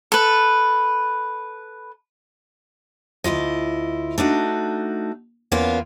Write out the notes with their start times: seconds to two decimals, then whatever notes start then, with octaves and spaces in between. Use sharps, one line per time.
0.12 A4 B4
3.24 D2 E4 F4 D#5
4.18 A3 D4 D#4 F#4
5.52 E2 A#3 B3 C#4 F4